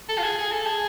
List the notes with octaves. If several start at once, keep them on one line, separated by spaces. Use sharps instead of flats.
A4
F4
G#4
G#4
A4
G#4